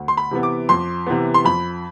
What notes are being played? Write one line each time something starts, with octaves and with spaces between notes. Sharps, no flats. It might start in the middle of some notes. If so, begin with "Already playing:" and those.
Already playing: D2
C6
B5
C3 E3 B3
D6
F2 C6
C3 E3 B3
C6
F2 B5